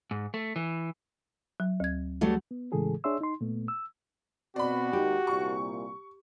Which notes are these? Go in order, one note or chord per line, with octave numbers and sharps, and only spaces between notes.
G#2
A3
E3
F#3
D2 G#6
F#3 G3 A3
B3
A2 C#3 E3 G#3 G#4 A4
D4 G#4 C#5 E5 C6 E6
D#4 C6
A#2 A3 B3
E6
B2 C4 F#4 D5 B5
D#2 G#3 D#4 G4
C2 A#2 C#6